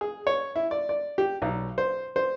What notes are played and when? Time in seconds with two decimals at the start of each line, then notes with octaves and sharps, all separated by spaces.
0.01 G#4
0.27 C#5
0.56 E4
0.71 D5
0.89 D5
1.18 G4
1.42 B1
1.78 C5
2.16 C5